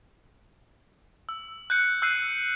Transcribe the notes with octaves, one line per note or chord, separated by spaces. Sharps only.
E6
F#6 G6 C#7
E6 F#6 G6 C7 D#7